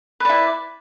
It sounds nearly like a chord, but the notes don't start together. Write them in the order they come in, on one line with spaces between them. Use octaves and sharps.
B4 D5 E4